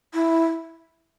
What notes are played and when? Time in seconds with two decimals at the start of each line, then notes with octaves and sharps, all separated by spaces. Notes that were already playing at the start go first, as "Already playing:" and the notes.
0.14 E4